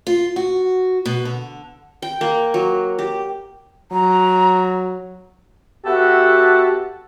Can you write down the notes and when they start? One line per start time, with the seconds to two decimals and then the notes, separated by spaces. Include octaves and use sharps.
0.07 F4
0.36 F#4
1.05 B2
1.25 D3
2.02 G5
2.21 A#3
2.54 F#3
2.99 G4
3.91 F#3 A#5
5.85 B3 F#4 G4 A4 E5 F#5